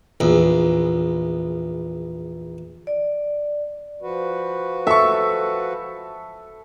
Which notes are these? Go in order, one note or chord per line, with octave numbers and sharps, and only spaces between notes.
A#1 E2
D5
F3 F#4 B4
A4 E5 C#6